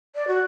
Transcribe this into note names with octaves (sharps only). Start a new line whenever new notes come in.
D5
F#4